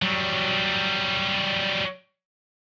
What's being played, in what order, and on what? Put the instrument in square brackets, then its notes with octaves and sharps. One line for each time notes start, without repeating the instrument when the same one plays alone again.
[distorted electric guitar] F#3 G3